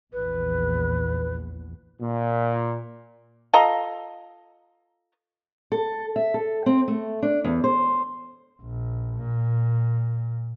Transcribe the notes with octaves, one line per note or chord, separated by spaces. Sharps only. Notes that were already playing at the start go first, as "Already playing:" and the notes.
A#1 E2 B4
A#2
F4 A4 D#5 A#5
A4
E5
A4
C4
A3
D4
E2
C5
A#1
A#2